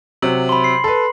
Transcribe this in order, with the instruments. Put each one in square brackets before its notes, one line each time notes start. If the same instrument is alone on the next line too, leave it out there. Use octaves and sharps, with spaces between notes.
[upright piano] C3 F#3 [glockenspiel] F#7
[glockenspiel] B5 C6
C7
[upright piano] A4 B4